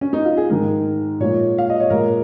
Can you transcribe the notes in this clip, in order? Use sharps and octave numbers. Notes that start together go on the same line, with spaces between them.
C#4
D#4
F4
G#4
G#2 D#3 G#3 A#4
A#2 F3 G#3 C#5
F5
D#5
C#5
A#2 G#3 A#4